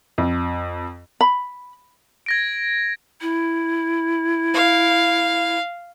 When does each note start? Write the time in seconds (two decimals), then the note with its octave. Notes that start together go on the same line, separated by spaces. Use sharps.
0.18 F2
1.21 B5
2.26 G#6 A#6 D7
3.21 E4
4.54 F5